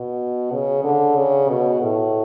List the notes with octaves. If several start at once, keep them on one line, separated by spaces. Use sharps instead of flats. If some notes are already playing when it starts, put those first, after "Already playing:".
Already playing: B2
C#3
D3
C#3
B2
A2